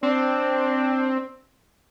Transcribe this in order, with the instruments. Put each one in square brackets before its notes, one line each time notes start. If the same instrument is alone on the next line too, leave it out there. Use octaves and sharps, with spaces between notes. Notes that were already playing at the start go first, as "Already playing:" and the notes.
[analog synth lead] C4 [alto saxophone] D4